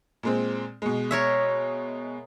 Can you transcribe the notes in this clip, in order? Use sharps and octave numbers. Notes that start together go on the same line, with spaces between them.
A#2 G#3 C4
B2 G#3
A#4 C#5 E5